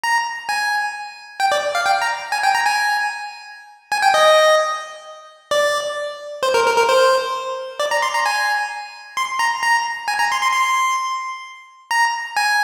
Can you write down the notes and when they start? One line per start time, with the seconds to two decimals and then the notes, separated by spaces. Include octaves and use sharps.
0.04 A#5
0.49 G#5
1.40 G5
1.52 D5
1.75 F5
1.86 G5
2.02 A#5
2.32 G#5
2.43 G5
2.55 A#5
2.66 G#5
3.92 G#5
4.02 G5
4.14 D#5
5.51 D5
6.43 C5
6.54 A#4
6.66 A#4
6.77 A#4
6.89 C5
7.80 D5
7.91 A#5
8.02 C6
8.14 A#5
8.26 G#5
9.17 C6
9.39 A#5
9.63 A#5
10.08 G#5
10.19 A#5
10.32 C6
10.43 C6
10.53 C6
11.91 A#5
12.36 G#5